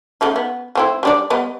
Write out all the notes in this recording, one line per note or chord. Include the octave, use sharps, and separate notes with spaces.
C#3 A3 D#4
B3
A3 C4 E4
G3 D4 D5
G3 B3 D#5